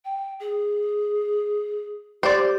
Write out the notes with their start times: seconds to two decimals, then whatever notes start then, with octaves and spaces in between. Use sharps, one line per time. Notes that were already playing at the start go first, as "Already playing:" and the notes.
0.05 G5
0.40 G#4
2.23 G4 C5 D5